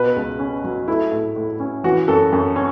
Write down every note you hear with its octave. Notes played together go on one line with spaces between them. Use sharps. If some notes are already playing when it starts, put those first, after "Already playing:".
Already playing: B2 B4
C#2
C#4
F#3
A3 E4
A2
A2
C#4
E3 F#4
F#2 A4
F#2
C#4